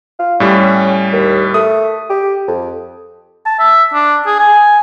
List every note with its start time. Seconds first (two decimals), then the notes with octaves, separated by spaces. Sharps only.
0.20 F4
0.40 A2 G3 C#4
1.13 D#2
1.54 A3 D#6
2.10 G4
2.48 F2
3.46 A5
3.59 E5
3.93 D4
4.26 G#4
4.40 G#5